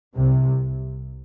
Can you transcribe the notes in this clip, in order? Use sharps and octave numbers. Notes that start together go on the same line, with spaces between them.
C2 C3